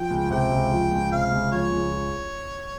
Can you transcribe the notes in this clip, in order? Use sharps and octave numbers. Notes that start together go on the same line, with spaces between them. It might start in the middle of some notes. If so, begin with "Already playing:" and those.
Already playing: F3 G5
C#2
C3 G5
C#2
F3
C#2
C3 F5
C#2
F3 C#5
C#2